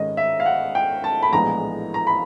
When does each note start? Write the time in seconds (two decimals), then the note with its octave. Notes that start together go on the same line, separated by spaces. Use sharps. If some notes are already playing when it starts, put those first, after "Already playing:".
Already playing: G#2 D#3 G#3 C#4 D#5
0.17 E5
0.40 F5
0.46 F#5
0.75 G5
1.04 A5
1.23 B5
1.33 A#1 A2 E3 G#3 B3 A#5
1.94 A#5
2.07 B5